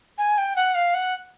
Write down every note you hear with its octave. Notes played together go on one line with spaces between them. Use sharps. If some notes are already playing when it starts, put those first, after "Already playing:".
G#5
G5
F#5
F5
F#5